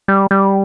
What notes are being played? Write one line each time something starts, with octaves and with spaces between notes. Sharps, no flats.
G3
G3